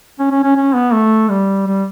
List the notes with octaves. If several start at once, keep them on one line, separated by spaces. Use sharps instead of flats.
C#4
C#4
C#4
C#4
B3
A3
G3
G3